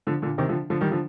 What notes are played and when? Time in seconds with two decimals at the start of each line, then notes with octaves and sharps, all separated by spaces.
0.07 D3 F3
0.22 A#2 D3
0.38 C3 D#3
0.49 D3 F3
0.70 D3 F3
0.81 D#3 G3
0.91 D3 F3